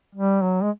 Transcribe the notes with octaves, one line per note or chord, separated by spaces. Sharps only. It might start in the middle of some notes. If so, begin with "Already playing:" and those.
G3
F#3
G#3